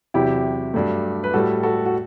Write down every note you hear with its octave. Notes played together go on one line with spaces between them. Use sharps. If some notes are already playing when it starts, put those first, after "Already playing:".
E2 C3 F#3 E4 G4
G2 F#3 A3
B4
A2 G3 F#4 A4
F#4 A4
F#4